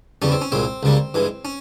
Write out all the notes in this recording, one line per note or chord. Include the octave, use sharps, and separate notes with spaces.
E2 C#3 G3 C#4
C4
C#4
C2 A#2 G#3 C4
C#2 C#3 G3 A#3
G2 E3 G#3
C#4